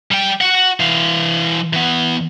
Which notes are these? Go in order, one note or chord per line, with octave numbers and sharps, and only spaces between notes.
G3 G5
F#4 F#5
E3 F5
E3 B3